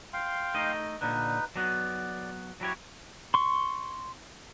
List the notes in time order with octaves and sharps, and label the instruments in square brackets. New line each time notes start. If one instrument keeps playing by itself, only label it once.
[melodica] F5 G5 C6
[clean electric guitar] A3 D#4 D#5
[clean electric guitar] A#2 D3 [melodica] D#4 B4
[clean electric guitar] F#3 B3 [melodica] D5
[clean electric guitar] F#3 G4 C#5 [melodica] E4
[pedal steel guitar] C6 C#6